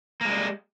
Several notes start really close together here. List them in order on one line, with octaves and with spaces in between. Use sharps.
A#3 G#3 G3